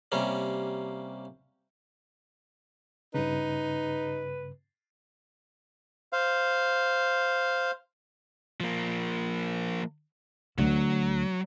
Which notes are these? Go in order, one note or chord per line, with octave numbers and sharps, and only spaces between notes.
C3 G3 A#3 C#4
G2 C#3 D#4 B4
C5 F5
F3 A#3
D2 F#3